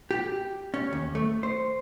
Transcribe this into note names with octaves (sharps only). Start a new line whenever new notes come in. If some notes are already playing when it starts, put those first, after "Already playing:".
G4
C#4
D#2
A3
C5